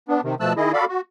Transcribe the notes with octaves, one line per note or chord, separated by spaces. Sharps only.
B3 D4
C3 D#3
B2 F3 A3 A5 E6 F#6
D#3 E4 G#4 D#5
F#4 A4 D5 F5 B5
F#4